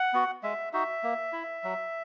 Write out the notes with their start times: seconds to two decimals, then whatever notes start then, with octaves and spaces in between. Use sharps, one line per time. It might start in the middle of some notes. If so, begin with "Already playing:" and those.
Already playing: F#5
0.13 B3 F#4
0.43 G#3 E5
0.73 D#4 F#4 E5
1.03 A#3
1.33 E4
1.64 F#3